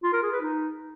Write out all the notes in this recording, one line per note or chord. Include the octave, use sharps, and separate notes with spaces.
F4
A#4
G#4
B4
D#4